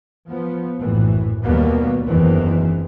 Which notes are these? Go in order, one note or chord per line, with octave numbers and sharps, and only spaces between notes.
F3 B3
A#1 F#2 A2 E3
D#2 B2 F#3 G3 A#3 B3
F#1 E2 G2 D#3 E3 C4